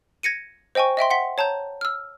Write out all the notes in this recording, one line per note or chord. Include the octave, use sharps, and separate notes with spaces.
G#6 A#6 C#7 D#7
C5 D#5 G5 G#5 C#6
D#5 E5 G5 C6
F#5 C6 B6
C#5 A5 A#5 G6
E6 F6